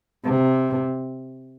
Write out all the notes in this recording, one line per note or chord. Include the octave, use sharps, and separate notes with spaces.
C3